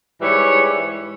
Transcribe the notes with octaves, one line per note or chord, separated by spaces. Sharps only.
G#2 E3 G3 C#5